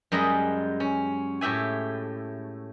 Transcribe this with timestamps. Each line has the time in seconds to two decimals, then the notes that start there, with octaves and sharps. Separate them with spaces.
0.12 F#2 G3 G#3 D#5
0.80 C#4
1.41 A2 G4 E5 G#5